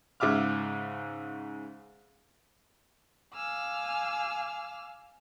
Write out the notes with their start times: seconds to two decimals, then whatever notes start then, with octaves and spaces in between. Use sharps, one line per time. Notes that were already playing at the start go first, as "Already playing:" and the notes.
0.20 G#2 C#3 E5 D6 F6
3.34 F5 G#5 D6 E6 F6